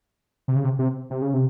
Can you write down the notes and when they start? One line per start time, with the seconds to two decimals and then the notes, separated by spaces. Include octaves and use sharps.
0.48 C3
0.56 C#3
0.64 C3
0.79 C3
1.10 C3
1.22 C#3
1.34 C3